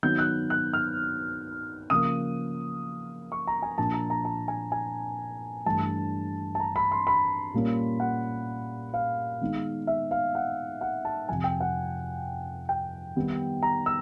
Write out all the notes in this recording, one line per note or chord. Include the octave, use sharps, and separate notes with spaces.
D#3 F#3 B3 D#4 G6
F#6
F#6
F6
C#3 F3 A#3 D#6
C#6
A#5
G#5
A#2 F3 A#3 D4 A5
A#5
A#5
A5
G#5
G#5
G2 E3 A3 D4 A5
A5
A#5
B5
C6
B5
A#2 G3 A#3 C#4
F#5
F5
D#3 G#3 B3 D#4
E5
F5
F#5
F#5
A5
F2 C3 F3 G#5
G5
F#5
G5
D#3 G3 B3 D#4
A#5
E6